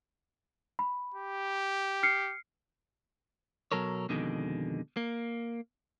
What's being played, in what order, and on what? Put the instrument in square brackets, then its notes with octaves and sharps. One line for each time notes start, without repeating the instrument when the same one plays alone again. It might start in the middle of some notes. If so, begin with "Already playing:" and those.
[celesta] B5
[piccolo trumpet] G4
[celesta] F6 C7 C#7
[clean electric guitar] B2 F#3 A4 A#4 C#5
F2 B2 D3 D#3 G#3
A#3